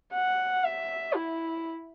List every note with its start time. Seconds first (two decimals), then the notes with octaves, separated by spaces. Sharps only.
0.13 F#5
0.64 E5
1.15 E4